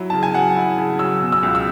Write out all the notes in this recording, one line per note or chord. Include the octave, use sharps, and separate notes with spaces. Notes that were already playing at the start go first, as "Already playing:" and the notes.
Already playing: F#3 E4
C#3 A5
G#5
F#3 F#5
E4
C#3
F#3 E6
B2
E6
C#2
E6